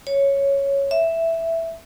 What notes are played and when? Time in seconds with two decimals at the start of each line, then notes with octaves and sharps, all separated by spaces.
0.07 C#5
0.91 E5